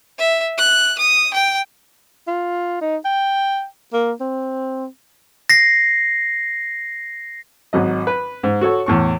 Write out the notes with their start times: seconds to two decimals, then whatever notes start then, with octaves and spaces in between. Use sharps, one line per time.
0.18 E5
0.58 F#6
0.98 D#6
1.34 G5
2.27 F4
2.81 D#4
3.05 G5
3.93 A#3
4.20 C4
5.50 A#6 C7
7.73 G#1 F#3 D#5
8.07 B4
8.43 G#2
8.61 F#4 A4 C#5
8.86 E2 A2 C#6